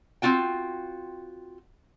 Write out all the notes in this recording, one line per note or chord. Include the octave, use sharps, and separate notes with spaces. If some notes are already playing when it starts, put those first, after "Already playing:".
C4 C#4 F4 F#4 G5